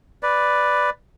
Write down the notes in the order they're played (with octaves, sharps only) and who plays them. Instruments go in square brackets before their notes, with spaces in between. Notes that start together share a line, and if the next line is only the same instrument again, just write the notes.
[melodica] B4 D5